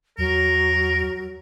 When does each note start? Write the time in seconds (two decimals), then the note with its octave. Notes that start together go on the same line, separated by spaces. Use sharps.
0.18 E2 F#3 A#4